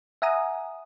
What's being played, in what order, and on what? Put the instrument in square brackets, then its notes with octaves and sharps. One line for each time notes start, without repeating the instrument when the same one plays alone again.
[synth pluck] E5 F#5 G#5 A#5 D#6